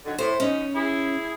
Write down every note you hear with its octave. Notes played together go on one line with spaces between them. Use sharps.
D3 D#3 F#3
A2 C5
F#2 C#4 D#4 D#5
E4 G#4